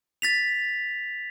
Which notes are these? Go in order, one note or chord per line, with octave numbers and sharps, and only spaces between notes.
A6 B6 F7